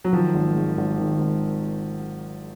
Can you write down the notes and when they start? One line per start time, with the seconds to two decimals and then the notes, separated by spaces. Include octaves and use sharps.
0.04 F#3
0.13 D#3 F3
0.34 G#1
0.56 G#2
0.78 G#1
0.99 D#3
1.19 G#1